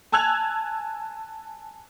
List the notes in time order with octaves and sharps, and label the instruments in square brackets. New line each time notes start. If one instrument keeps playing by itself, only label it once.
[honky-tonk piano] G#5 A5 E6 F#6 G#6 F7